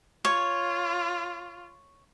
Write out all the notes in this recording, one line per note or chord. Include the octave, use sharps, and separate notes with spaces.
F4 C#5